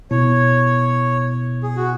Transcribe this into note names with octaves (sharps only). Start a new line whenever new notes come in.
B2 B3 E4 C#5
G#4
F#4